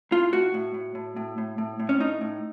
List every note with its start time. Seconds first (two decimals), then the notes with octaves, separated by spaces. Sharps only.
0.11 A2 F4
0.33 A2 F#4
0.54 A2
0.74 A2
0.95 A2
1.16 A2
1.38 A2
1.58 A2
1.80 A2
1.89 C#4
2.00 A2 D#4
2.21 A2